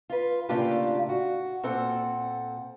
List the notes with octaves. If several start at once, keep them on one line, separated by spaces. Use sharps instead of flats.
F4 B4
A2 C#3 A#3 D4 F4 G4
F#4
A#2 C4 A4 F#5